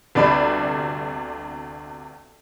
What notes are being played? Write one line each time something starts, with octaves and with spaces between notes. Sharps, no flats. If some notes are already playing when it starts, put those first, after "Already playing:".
G1 D2 C3 D5 B5